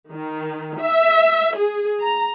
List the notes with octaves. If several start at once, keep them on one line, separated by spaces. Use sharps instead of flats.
D#3
E5
G#4
A#5